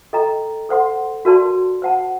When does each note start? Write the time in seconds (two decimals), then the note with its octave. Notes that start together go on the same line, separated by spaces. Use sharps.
0.13 A4 D#5 G5 A#5
0.69 A4 C5 F#5 C6
1.25 F#4 A#4 D5 A5 C6
1.82 C5 F#5 A5